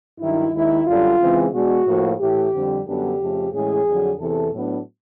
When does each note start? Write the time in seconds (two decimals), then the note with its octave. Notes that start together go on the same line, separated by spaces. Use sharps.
0.20 G2 D#3 F#3 E4
0.53 D#2 D#3 G#3 E4
0.87 F#2 D3 G3 F4
1.20 C#3 E3 G#3 C4
1.53 B2 G#3 B3 D4 F#4
1.86 A2 F3 A#3
2.20 A2 E3 A3 G4
2.53 F2 D3 G3 C4
2.86 F#2 D3 G3 B3 D4 G4
3.19 F2 C#3 F3 A3
3.53 A2 E3 G#3 C#4 G#4
3.86 F2 D3 F#3
4.19 E2 C3 E3 A4
4.53 A2 F#3 B3 D4